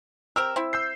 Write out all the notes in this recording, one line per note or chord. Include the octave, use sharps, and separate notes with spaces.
C4 G4 A#4 E6
C4 E4
E6 G6 C7